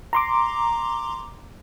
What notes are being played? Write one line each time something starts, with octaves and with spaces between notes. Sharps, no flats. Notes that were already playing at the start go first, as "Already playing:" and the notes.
A#5 C6 D6